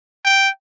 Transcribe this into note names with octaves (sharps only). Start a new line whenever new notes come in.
G5